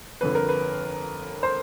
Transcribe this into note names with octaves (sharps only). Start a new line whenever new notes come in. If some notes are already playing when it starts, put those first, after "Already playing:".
G1 F2 D3 B4
A#4
B4
C5